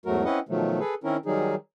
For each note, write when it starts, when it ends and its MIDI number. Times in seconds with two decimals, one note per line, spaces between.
0.06 0.24 40
0.06 0.24 44
0.06 0.24 54
0.06 0.24 57
0.06 0.24 66
0.06 0.24 70
0.24 0.39 60
0.24 0.39 61
0.24 0.39 64
0.24 0.39 71
0.24 0.39 75
0.24 0.39 78
0.49 0.79 47
0.49 0.79 51
0.49 0.79 53
0.49 0.79 54
0.49 0.79 57
0.79 0.94 68
0.79 0.94 69
0.79 0.94 71
1.04 1.17 51
1.04 1.17 60
1.04 1.17 61
1.04 1.17 64
1.04 1.17 70
1.26 1.55 51
1.26 1.55 54
1.26 1.55 55
1.26 1.55 63
1.26 1.55 68